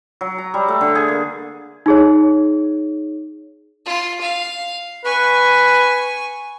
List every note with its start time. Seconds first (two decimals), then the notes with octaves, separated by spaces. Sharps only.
0.21 F#3
0.38 A#5
0.54 G3
0.68 A3
0.81 D3
0.95 G#4
1.08 A#3
1.86 D#4 G#4 C#5
3.85 F4
4.21 F5
5.05 B4 G#5 C#6